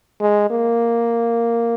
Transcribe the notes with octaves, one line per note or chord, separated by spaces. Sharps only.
G#3
A#3